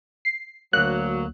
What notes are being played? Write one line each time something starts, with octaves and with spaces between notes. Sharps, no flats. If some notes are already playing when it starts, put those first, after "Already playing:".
C7
D2 F#3 A#3 F#6